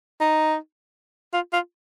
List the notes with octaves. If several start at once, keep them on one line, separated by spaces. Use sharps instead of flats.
D#4
F4
F4